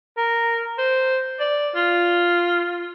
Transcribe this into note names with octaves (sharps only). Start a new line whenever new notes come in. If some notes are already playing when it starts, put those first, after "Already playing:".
A#4
C5
D5
F4